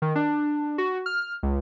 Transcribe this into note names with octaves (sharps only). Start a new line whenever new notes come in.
D#3
D4
F#4
F6
C#2